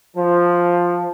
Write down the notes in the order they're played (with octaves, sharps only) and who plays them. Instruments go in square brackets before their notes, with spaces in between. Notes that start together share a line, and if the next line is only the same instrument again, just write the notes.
[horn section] F3